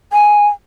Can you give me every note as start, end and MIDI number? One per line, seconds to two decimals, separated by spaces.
0.13 0.47 80